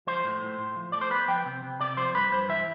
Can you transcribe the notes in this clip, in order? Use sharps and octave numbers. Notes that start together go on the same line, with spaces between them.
F3 C5
A2
A2
A2
F3
A3 D5
C5
B3 B4
F3 G5
C3
C3
C3 D5
F3 C5
G2 B4
G2 C5
E3 E5